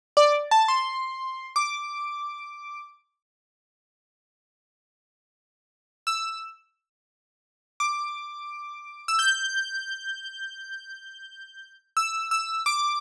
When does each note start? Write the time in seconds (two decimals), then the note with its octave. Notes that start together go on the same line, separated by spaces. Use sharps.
0.17 D5
0.51 A5
0.68 C6
1.56 D6
6.07 E6
7.80 D6
9.08 E6
9.19 G6
11.97 E6
12.31 E6
12.66 D6